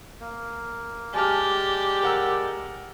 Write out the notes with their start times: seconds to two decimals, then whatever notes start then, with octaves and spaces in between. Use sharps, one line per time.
0.21 A#3
1.14 G#3 G4 D5 G#5 A5 F6
2.03 A#4 F#5 E6